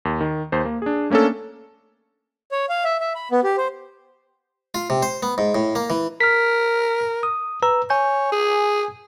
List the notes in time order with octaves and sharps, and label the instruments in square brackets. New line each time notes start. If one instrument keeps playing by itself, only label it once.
[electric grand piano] D#2
D#3
D#2 C5
A#3
D4 G#4
A3 A#3 C#4 D4 A4
[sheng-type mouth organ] C#5
F5
E5
E5
B5
B3
G4
C5
[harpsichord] F4
C3
C5
B3
G#2
A2
A#3
E3
[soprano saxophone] A#4 [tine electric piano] F6 B6
[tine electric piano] D#6
B4 A#5 E6
[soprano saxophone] C#5 [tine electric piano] G#5 G6
[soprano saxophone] G#4